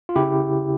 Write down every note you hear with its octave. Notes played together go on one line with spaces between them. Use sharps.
F4
C#3 E4 G4